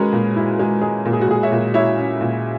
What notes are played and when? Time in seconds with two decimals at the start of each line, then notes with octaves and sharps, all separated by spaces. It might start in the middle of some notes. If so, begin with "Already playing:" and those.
Already playing: G#3 C#4 F#4 G#4 A#4 B4
0.12 A#2
0.36 E4
0.59 G#3
0.81 G#3 G#4
1.05 A#2
1.13 G#4
1.21 F#4
1.28 A#2 G#4
1.43 C#5 E5
1.52 A#2
1.74 E4 C#5 E5
1.98 C#4
2.21 A#2